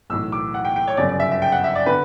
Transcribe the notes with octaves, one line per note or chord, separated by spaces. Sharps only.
B1 A2 E3 E6
D6
F#5
G5
G5
C#5
G1 F#2 C#3 D5
D5
E5
E5
G5
F#5
E5
D5
D3 B4